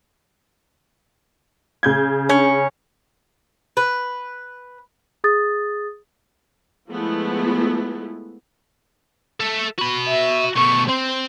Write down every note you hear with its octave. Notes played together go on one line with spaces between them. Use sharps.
C#3 G6 G#6
C#4
B4
G#4 D#6 A6
F3 G#3 A3 B3 E4
A4 E5
F#4 B5
E5
B2 A3 C#6
C4 C5